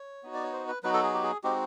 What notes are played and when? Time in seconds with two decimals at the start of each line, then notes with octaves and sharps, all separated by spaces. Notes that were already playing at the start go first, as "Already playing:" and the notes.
Already playing: C#5
0.23 B3 D#4 F#4
0.34 D5
0.43 C#5
0.53 C5
0.68 B4
0.83 F#3 B3 D#4 F#4 B4
0.94 A4
1.03 G#4
1.14 G4
1.23 G#4
1.44 G#3 C4 D#4 F#4 G4